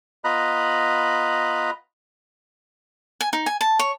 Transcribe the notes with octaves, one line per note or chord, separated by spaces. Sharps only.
B3 F4 D#5 A#5 B5 F#6
G#5
D#4
G#5
A5
C#5